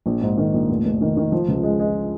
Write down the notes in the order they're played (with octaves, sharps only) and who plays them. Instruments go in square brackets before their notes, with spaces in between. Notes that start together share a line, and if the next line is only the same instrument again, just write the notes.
[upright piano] A#1
G#2
D#3
A#1
F1
F1
D#3
D#3
F3
C#2
G#3
G#3